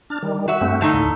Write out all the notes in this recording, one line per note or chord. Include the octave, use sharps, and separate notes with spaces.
D4 F6
D#3 G3
F#4 E5
G2 A3 C4
D3 A3 D#4 F5
D#2 A2